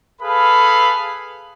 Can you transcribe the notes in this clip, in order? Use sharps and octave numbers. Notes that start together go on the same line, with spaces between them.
G#4 A4 B4 F5 B5